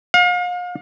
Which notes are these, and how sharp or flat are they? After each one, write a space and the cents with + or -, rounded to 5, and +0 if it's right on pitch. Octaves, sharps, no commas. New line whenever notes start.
F5 +40